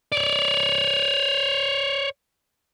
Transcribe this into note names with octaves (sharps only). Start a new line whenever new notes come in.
C#5 D5